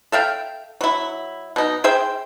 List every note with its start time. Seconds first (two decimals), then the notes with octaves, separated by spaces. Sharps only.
0.12 A4 E5 F5 G5
0.81 F#3 E4
1.56 B2 D#4
1.84 G#4 C5 E5 G5